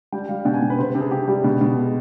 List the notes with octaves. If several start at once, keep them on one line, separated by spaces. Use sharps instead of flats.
G3 G5
G3 F5
B2 G5
G#5
B2
B4
C3 C5
B4
C3
G#4
C3 G4
G3 G4
B2
B2
G#3